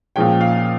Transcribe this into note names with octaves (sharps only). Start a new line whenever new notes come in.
A#2 F3 G#3 C#4 G5
F5